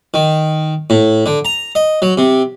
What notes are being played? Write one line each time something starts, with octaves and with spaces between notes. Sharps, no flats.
D#3
A2
D3
A#5
D#5
F#3
C3